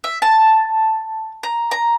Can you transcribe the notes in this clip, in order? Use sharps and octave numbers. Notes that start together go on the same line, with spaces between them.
E5
A5
A#5
A#5